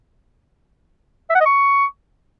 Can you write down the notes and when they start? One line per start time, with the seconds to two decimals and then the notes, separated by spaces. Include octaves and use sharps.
1.30 E5
1.35 F#5
1.41 D#5
1.46 C#6